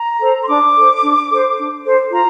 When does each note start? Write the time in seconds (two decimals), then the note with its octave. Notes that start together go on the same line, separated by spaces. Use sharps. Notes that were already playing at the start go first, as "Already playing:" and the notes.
Already playing: A#5
0.21 A4 C5
0.41 C6
0.48 D4 D6
0.76 A4 C5
1.02 D4
1.31 A4 C5
1.57 D4
1.84 A4 C5
2.11 F4 A#5